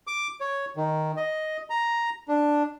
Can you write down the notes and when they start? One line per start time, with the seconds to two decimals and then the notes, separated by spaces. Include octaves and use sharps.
0.07 D6
0.41 C#5
0.77 D#3
1.17 D#5
1.70 A#5
2.28 D4